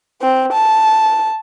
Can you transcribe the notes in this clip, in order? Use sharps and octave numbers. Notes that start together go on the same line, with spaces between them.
C4
A5